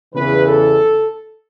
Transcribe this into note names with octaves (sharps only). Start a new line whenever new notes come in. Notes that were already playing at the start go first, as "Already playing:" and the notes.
E2 C#3 E3 B4
A4